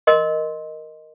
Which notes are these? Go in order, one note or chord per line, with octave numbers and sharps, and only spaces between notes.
A#4 D#5 C6